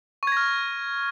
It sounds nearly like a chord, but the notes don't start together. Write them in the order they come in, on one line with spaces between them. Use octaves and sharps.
C#6 G#6 A#6 F6